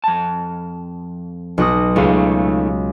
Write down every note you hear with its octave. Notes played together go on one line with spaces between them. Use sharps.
F2 A5
B1 F#4 D#6
C#2 A3 D#4 F5